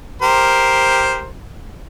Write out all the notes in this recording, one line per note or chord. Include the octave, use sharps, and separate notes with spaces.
G4 A#4 C5